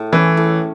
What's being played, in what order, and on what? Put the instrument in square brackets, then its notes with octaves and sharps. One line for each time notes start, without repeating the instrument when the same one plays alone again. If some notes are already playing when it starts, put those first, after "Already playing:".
Already playing: [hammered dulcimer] A2
[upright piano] E3 [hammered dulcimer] C#4
[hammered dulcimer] A2